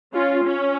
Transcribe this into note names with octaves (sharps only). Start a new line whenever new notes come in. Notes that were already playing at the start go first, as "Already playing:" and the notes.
C#4 F4
C#4